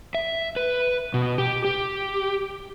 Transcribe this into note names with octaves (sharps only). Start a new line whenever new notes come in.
E5
B4
B2
G4
G4